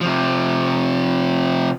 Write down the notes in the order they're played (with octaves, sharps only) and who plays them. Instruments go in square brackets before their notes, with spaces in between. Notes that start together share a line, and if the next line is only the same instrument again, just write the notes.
[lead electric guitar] C3 F3